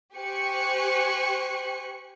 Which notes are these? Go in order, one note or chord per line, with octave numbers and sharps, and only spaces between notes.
G4 C5 G#5 C#6 F#6 C#7